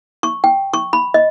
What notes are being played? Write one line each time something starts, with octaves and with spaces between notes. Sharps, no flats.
C#6
G5
C#6
B5
D#5